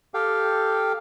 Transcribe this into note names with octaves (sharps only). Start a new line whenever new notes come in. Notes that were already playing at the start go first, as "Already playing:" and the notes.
G4 A4 F5 G5